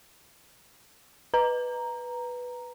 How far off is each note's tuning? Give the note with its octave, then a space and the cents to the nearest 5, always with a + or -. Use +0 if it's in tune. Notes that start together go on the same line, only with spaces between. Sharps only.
B4 +0 A#5 +0